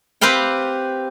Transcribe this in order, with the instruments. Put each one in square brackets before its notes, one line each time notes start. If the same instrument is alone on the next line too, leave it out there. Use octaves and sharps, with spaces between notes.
[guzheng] C4 G4 B4 F5 G5